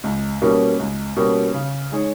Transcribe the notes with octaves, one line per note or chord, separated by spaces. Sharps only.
C#2
B2 G3 A#3 C#4
C#2
B2 G3 A#3 C#4
C#3
G#3 D#4 G#4 C#5